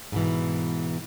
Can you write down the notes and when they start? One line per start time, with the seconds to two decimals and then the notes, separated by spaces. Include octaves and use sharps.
0.12 G#2 B2 E3